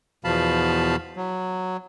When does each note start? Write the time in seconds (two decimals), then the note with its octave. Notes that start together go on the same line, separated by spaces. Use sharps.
0.25 E2 B2 F3 F5 A5 B5
1.17 F#3